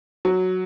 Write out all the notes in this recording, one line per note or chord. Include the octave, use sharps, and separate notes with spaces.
F#3